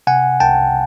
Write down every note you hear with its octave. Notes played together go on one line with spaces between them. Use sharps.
C3 F#5 G#5
C2 G5 A5